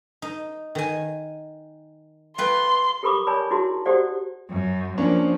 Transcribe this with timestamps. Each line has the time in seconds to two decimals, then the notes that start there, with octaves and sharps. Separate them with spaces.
0.22 D#4
0.75 D#3 G#5
2.38 F4 B4 G5 C6
3.03 G4 A4 A#4 B5 C#6 D6
3.27 A#4 C#5 D5 G#5 A5 B5
3.51 D#4 E4 F#4 G#4 A5 C6
3.86 F#4 G4 A4 C5 D5 F#5
4.50 F#2
4.98 F3 A#3 C#4 D4